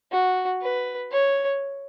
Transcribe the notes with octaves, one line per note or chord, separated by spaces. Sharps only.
F#4
B4
C#5